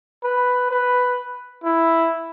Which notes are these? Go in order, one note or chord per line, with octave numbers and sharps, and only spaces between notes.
B4
B4
E4